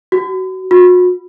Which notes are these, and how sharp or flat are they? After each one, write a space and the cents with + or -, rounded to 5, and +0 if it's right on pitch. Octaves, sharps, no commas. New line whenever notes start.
F#4 +25
F#4 -40